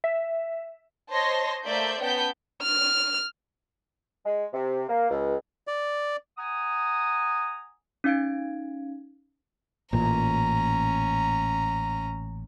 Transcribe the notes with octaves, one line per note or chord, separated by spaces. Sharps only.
E5
C5 C#5 D#5 A5 C6 A#6
A3 A#3 C5 D5 E5 G6
B3 C#4 G5 A5 G6 B6
F6
G#3
C3
A#3
C#2
D5
F#5 G#5 A#5 D#6
C#4 D#4 F5 G#6 D7
A1 A#2 C#4 A#5